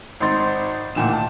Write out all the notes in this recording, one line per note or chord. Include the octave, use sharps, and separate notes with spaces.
G#1 C4 D#4 C6 A6
D2 A#2 D#3 E3 E7
D#3 A5